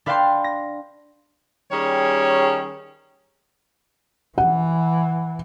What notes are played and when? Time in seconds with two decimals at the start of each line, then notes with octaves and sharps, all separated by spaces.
0.06 D4 B4 F5 G5 A5 C6
0.44 A#6
1.71 D#3 G3 C#4 G#4 C#5
4.38 E3 F#5